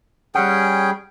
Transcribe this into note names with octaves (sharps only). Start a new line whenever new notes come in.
G3 C#4 G#4 F#5 G5